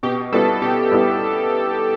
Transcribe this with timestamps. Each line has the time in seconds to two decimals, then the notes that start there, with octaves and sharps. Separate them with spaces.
0.03 B2 G4
0.32 G3 B3 E4 A4
0.62 B2 G4
0.91 G3 B3 E4